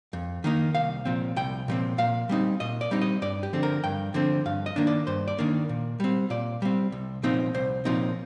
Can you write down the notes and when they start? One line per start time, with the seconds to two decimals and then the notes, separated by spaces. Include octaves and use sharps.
0.13 F2
0.44 D#3 A#3 D#4
0.75 C2 F5
1.05 A#2 F3 C4
1.36 C2 G5
1.68 A#2 F3 C4
1.98 A#2 F5
2.29 G3 C4 D#4
2.60 A#2 D#5
2.81 D5
2.91 G3 C4 D#4
3.01 D#5
3.22 G2 D5
3.43 G4
3.53 D3 F3 C4
3.63 A#4
3.84 G2 G5
4.14 D3 F3 C4
4.46 G2 F5
4.66 D#5
4.76 D#3 A#3 D4
4.87 D5
5.07 G2 C5
5.28 D5
5.39 D#3 A#3 D4
5.69 A#2
6.00 G3 C4
6.30 A#2 D5
6.62 G3 C4
6.92 C2
7.23 A#2 F3 C4 D#4
7.54 C2 C5
7.85 A#2 F3 C4 D#4